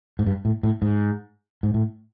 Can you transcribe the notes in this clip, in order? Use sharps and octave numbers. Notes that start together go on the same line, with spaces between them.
G#2
G2
A2
A2
G#2
G#2
A2